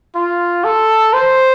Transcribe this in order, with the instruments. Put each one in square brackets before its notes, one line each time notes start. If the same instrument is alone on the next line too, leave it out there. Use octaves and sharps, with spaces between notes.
[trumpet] F4
A4
C5